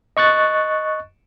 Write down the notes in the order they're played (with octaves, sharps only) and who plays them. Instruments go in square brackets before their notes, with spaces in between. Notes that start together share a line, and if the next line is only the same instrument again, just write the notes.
[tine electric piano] D#5 C#6 F#6 A6